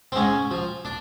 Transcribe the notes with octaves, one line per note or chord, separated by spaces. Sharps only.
C4
G#2 C#4
F3
D4